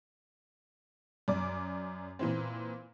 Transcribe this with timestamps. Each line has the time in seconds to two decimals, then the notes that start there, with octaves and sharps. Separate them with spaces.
1.28 F#2 D5 D6
2.19 A#2 E3 C4